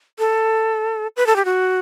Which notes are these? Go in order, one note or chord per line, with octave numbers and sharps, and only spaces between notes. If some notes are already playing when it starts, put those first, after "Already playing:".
A4
B4
A4
G4
F#4